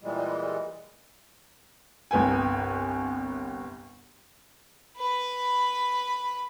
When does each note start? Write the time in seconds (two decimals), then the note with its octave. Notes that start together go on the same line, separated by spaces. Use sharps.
0.02 A#2 E3 G3 G#3
2.11 G1 C2 B3 G5 G#5
4.97 B4 B5